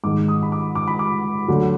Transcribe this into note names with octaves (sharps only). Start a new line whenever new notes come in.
G#2 D#3 G#3 D6
D#6
B5
D6
D6
B5
D6
D2 D3 F#3